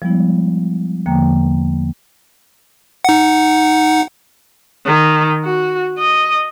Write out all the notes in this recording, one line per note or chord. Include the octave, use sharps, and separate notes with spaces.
F3 G3 G#3 B3 E4
E2 D3 F3 A#3 G5 A#5
D#4 F#5
D#3
F#4
D#5